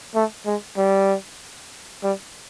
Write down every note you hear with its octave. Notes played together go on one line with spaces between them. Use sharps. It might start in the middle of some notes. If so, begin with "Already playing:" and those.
A3
G#3
G3
G3